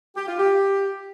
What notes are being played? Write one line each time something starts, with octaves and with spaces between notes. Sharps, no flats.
G4
F4
G4